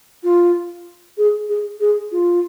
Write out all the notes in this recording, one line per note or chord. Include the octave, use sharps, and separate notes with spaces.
F4
G#4
G#4
G#4
F4